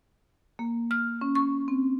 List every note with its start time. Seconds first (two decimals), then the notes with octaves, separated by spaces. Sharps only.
0.59 A#3
0.91 F6
1.21 C#4
1.35 C#6
1.68 C4